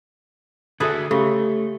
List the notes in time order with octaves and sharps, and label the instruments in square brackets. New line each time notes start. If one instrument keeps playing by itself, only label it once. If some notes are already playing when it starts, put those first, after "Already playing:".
[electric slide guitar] D3 F#4 E5 [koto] G#4 A4 B4
[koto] C#3 [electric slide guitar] A3 [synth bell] G4 A4